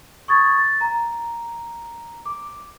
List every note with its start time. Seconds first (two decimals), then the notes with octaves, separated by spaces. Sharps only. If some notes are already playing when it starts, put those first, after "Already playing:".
0.28 C#6 D#6 G#6 A6
0.58 A6
0.81 A#5
2.26 D6